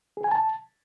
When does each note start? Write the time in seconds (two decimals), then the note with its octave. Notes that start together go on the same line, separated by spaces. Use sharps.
0.17 G#4
0.24 G#5
0.31 A5